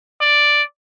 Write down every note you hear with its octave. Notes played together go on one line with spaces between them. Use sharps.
D5